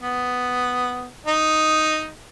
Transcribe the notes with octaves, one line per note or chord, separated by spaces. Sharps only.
B3
D#4